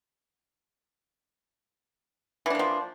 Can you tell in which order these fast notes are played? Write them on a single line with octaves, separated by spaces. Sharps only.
E3 D4 A#3 F3